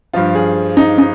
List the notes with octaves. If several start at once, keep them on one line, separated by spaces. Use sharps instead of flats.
G2 F3 F4
G#4
D#4
D#4